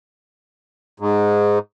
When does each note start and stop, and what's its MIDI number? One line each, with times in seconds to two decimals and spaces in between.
1.00 1.59 44